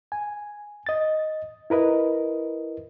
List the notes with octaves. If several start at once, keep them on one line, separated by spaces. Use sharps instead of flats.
G#5
D#5 A6
E4 A#4 B4 D#5